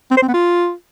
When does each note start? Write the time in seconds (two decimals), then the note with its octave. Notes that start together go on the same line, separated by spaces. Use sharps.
0.11 C4
0.17 C5
0.22 C4
0.28 B3
0.34 F4